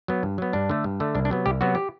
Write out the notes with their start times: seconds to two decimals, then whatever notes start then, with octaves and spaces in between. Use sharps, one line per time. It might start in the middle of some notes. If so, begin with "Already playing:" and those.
0.08 F#3 B3
0.23 G2
0.38 F#3 B3
0.53 G2 D4
0.70 D3 A3
0.84 G2
1.00 D3 A3
1.15 C2 D4
1.25 D4
1.30 C3 F#3 B3
1.46 C2 G4
1.61 C3 F#3 B3 F#4
1.75 G4